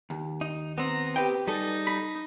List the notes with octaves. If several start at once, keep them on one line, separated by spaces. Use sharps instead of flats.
D#2
D#4
B3 C4 A#5
G4 B4 G5
G3 D#4 G#4 A4
B5